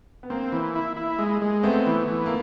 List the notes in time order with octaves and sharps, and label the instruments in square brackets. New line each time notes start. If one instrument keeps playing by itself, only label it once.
[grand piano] B3
[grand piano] A#3 [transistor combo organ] C4
[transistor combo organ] E3
E4
E4
G#3
G#3
[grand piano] A3 B3 [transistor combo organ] C4
[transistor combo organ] E3
E3
[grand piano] A#3